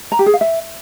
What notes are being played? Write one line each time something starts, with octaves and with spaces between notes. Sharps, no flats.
A#5
G4
G#4
F5
E5